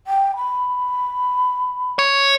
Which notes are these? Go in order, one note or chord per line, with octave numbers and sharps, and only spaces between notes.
G5
B5
C#5